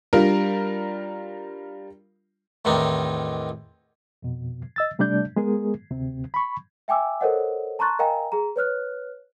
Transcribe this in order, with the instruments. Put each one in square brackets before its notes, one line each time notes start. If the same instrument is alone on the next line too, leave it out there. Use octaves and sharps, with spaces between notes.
[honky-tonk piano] G3 D4 F4 A#4
[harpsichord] E2 A2 D#3 C4 D4 D#4
[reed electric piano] F2 B2
D#5 E6 A6
C3 G3 A3 D4 D5 G6
G#3 B3 G#4 A#4
D2 C3 C4
B5 C#6
[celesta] E5 G5 G#5 D6 E6
A4 A#4 C5 C#5 D#5 F#5
A5 A#5 C6 C#6 F#6 A6
A#4 D#5 F5 G5 G#5 A#5
G#4 A#5
B4 C#5 F6 F#6